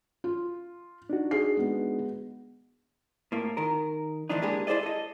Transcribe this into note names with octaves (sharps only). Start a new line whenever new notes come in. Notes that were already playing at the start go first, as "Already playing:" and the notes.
F4
D4 D#4 F#4
G#4 C7
G#3 B3
A2 A#3
D#3 A#4
A2 D3 E3 F3 D4 D#4
G#3 A#3 D4 G4 G#4 B4
E4 G#4 C5 D5 D#5
A4 D#5